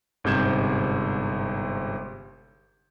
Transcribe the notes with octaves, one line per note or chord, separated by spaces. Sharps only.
G1 G#2 C3 G6 G#6 E7